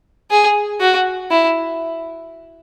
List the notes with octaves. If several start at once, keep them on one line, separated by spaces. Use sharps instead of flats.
G#4
F#4
E4